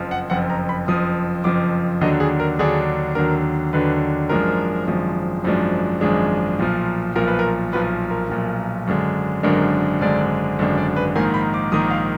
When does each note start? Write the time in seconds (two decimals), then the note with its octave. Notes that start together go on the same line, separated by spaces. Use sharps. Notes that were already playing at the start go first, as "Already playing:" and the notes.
Already playing: F#1 F2 F3
0.11 F#5
0.30 F#1 F2 F3 F#5
0.50 A#5
0.69 B5
0.87 F#1 F2 F3 D#6
1.44 F#1 F2 F3 D6
2.01 D#2 D3 F#3 D4 D#5
2.20 G#4
2.40 A#4
2.59 D#2 D3 F#3 D4 G#4
3.15 D#2 D3 F#3 D4 A#4
3.73 D#2 D3 F#3 D4 B4
4.29 G#1 F#2 F3 G#3 D4 A#4
4.87 G#1 F#2 F3 G#3 D4
5.44 G#1 F#2 F3 G#3 D4
6.01 G#1 F#2 F3 G#3 D4 G#4
6.59 B1 A#2 F3
7.15 B1 A#2 F3 A#4
7.27 B4
7.39 A#4
7.72 B1 A#2 F3 B4
8.11 A#4
8.30 B1 A#2 F3
8.87 G#1 F#2 D3 G#3 D4
9.43 G#1 F#2 D3 G#3 D4 A#4
10.01 G#1 F#2 D3 G#3 D4 D5
10.59 G#1 F#2 D3 G#3 D4
10.78 D5
10.96 B4
11.15 A#1 G#2 D#3 A#3 G#5
11.34 B5
11.54 D6
11.72 A#1 G#2 D#3 A#3 D#6
11.91 F5